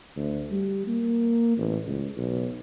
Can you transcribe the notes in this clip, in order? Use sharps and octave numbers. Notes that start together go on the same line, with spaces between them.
D2
G3
A#3
A1
C#2
B1